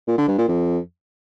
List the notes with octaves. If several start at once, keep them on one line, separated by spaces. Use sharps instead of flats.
A#2
D3
G2
A#2
F2